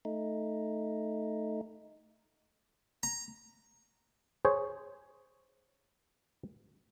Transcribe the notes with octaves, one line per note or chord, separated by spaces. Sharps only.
A3 D#4
A#5
G#4 C5 C#5